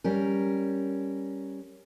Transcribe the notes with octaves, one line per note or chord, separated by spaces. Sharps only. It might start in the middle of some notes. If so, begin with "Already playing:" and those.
G3 C#4 A#4